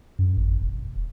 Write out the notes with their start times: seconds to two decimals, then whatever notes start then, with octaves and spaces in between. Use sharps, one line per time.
0.19 F#2
0.37 G#1
0.62 E1